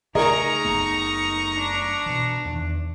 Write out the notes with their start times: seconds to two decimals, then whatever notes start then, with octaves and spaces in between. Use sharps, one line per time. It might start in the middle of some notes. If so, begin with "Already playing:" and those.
0.15 C#3 A3 D#4 G#4 A#4 D#5 A#5 C#6
0.65 F#1 A3 B3
1.58 D4
2.06 B2 E3
2.45 E2 D#3